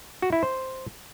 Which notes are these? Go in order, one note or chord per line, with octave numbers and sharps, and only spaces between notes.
F#4
E4
C5